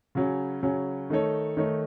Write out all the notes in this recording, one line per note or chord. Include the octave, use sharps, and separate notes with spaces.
C#3 F#3 C#4
C#3 F#3 C#4
D#3 A3 D#4 A4 C#5
D#3 A3 D#4 A4 C#5